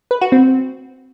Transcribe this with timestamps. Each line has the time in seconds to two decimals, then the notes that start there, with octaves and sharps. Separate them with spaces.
0.11 B4
0.21 F#4
0.32 C4